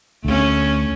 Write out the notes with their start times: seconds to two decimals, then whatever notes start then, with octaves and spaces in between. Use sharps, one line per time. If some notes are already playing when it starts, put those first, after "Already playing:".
0.25 D2 A3 C#4